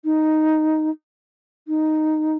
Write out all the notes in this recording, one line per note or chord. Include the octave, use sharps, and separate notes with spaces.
D#4
D#4